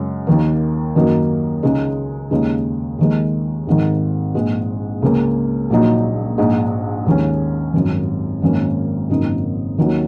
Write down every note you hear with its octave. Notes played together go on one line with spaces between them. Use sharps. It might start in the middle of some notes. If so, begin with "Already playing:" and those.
Already playing: F#2 C#3 G#3
D#2 D#3 A#3
F#2 D#3 F#3 A#3 D#4
C#2 C#3 G#3 D#4
D#2 C#3 G#3 D#4
D#2 D#3 G#3
G#1 G#2 D#3
A#1 G#2 G#3
C#2 C#3 A#3 C#4
A#1 A#2 F#3 D#4
A#1 G#2 G#3 D#4
D#2 D#3 G#3 C#4
G#1 F#2 D#3
G#1 F#2 D#3 A#3 C#4
G#1 F#2 C#3 A#3 D#4
D#2 D#3 F#3 C#4